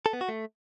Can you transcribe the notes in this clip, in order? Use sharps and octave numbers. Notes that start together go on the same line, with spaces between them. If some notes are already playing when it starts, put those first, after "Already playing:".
A4
B3
F#4
A3